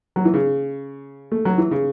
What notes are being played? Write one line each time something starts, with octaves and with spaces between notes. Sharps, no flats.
F#3
E3
C#3
A3
F#3
E3
C#3